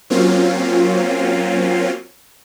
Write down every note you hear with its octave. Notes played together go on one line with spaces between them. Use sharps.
F#3 A#3 C4 C#4 F4